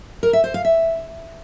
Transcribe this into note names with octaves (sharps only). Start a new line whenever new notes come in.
A#4
E5
C5
F5
E5